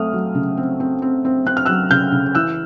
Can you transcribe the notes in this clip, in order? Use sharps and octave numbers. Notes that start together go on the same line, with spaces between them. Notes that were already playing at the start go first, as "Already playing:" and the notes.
Already playing: F#3 A3 C4 D#6 F6
F#3
C#3
C4
C4
C4
C4
C4 F#6
F6
F#3 E6 F#6
C#3 F6 G6
C#3
E3 E6 F#6